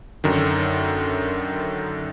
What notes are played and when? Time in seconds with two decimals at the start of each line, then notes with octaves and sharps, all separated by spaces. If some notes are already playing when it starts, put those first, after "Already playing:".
0.24 F#2 D3 D#3